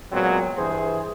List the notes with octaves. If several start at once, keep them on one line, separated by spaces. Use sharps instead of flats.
A#2 F#3 G#3 B3 C4
G2 E3 G#4 C5